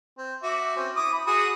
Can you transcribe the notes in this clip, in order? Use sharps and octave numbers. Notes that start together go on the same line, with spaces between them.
C4
F#4 E5 D6
C4 C#4
E4 D6 D#6
B5
F#4 G#4 D#6